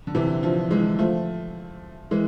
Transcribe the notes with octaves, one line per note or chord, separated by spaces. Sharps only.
D3
C3 E3
D3 F3
E3 G#3
F3 A3
E3 G#3